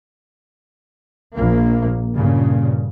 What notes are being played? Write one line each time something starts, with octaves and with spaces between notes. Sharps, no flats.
A#1 A#3
G2 A#2 C#3